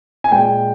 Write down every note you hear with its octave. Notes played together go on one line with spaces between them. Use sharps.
G#5
A#2 G#3 G5